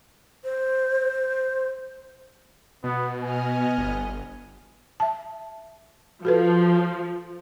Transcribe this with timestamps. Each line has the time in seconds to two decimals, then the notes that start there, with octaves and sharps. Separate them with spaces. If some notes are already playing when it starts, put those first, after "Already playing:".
0.44 C5
2.84 B2 B3
3.23 B3 D#5 G#5 F6
3.78 G1
5.00 E5 A5
6.25 F3 F#4 A4 B4